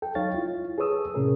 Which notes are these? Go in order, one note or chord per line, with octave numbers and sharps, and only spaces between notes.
A4 G5
F#3 D#4 C#5 F5 A6
E4 F4
G#4 A4 B4 C#5 D#6 E6
A2 C3 C#4 G#4 A#4